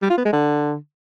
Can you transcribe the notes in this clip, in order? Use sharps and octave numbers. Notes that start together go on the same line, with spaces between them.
G3
F4
B3
G#3
D3